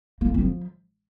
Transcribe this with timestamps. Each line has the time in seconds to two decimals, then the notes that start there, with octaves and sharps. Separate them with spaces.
0.21 A#3
0.28 E3
0.34 C4
0.41 F3